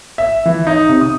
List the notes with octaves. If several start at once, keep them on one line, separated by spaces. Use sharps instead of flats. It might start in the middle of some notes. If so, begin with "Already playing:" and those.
E5
E3
D#4
C3
D#6